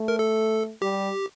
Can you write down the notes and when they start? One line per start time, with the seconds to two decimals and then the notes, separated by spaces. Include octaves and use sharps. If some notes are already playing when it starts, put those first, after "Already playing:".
Already playing: A3
0.08 A#4
0.19 A4
0.82 G3 G4